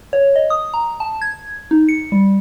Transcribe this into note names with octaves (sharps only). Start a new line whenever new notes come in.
C#5
D#5
D#6
A#5
A5
G#6
D#4
C#7
G3